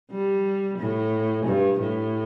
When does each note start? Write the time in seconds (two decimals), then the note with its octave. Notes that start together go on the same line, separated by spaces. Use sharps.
0.11 G3
0.78 A2
1.45 G2
1.79 A2